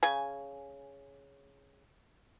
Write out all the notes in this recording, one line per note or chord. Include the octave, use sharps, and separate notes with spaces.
C#3 G#5